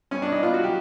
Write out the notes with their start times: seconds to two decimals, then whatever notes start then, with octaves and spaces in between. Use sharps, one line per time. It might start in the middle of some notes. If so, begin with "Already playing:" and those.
0.11 G2 C#4
0.22 D4
0.27 G2
0.32 D#4
0.42 B3 F4
0.54 F#4
0.59 F#3 G4